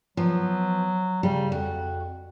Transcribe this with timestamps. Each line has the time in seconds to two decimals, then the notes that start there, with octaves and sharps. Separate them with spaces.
0.17 F3 F#3 B3
1.23 C#3 G3
1.52 F2 F#4